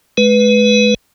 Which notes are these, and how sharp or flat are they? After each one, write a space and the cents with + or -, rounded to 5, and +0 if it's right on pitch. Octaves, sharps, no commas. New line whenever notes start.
G#3 +35 B4 +0